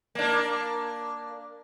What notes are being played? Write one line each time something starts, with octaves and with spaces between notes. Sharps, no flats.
A#3 D4